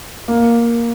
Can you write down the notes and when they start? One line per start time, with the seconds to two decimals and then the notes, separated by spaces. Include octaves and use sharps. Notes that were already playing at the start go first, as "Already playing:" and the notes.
0.28 A#3